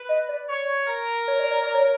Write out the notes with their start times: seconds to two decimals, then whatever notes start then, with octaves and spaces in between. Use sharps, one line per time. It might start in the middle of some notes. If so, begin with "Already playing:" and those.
Already playing: B4
0.09 D#5
0.29 D5
0.49 C#5
0.88 A#4
1.28 C#5
1.39 D5
1.51 C#5
1.62 D5
1.74 C#5